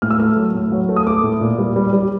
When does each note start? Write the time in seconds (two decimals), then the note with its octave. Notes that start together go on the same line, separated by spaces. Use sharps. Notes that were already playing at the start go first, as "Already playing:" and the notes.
0.02 A2 F6
0.11 E6
0.19 A3 F6
0.36 F#3
0.54 A2
0.72 F#3
0.89 A3
0.96 D#6
1.07 A3 D6
1.23 A2
1.41 A#2
1.59 G3
1.76 G3
1.93 G3